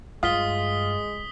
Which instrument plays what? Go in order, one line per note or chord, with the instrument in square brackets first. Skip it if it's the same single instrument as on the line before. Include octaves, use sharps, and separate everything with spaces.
[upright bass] G2 [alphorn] G#3 [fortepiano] F4 [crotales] D#6 B6 G7